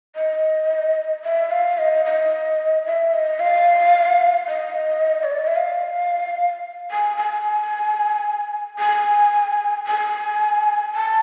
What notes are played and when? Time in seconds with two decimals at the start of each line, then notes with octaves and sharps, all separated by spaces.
0.16 D#5
1.24 E5
1.51 F5
1.78 D#5
2.05 D#5
2.86 E5
3.13 D#5
3.39 F5
4.48 D#5
5.23 C#5
5.31 D5
5.39 D#5
5.47 E5
5.56 F5
6.91 G#5
7.17 G#5
8.79 G#5
9.87 G#5
10.95 A5